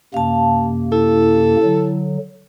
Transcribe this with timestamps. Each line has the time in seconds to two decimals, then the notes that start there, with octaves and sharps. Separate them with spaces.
0.14 F#2 C3 A#3 F5 A5
0.92 E4 A4
1.64 D3 F#3